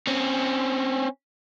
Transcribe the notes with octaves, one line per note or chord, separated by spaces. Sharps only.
C4 C#4